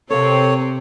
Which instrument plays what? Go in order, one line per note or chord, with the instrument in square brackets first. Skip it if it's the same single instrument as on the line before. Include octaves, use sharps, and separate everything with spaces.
[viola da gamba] C3 C4 [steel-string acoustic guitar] A4 A#4 F5 [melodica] C#5